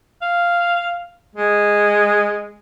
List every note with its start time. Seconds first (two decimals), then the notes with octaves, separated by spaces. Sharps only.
0.22 F5
1.36 G#3